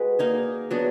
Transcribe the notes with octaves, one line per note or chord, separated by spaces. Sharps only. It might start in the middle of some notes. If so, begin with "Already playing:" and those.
Already playing: G#3 F#4 B4
A#3 D#4 G#4
F#3 B3 D4 G#4